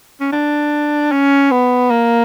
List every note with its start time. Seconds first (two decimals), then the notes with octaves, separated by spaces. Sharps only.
0.20 C#4
0.32 D4
1.12 C#4
1.51 B3
1.91 A#3